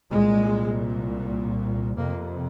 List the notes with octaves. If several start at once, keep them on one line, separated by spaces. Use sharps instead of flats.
C2 A#2 G#3
F2 C3 A#3